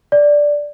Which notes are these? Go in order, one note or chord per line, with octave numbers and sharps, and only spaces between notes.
D5